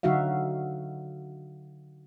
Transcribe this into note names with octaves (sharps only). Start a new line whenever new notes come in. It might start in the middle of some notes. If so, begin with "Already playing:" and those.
D3 F#3 D#4 F#4 E5 F5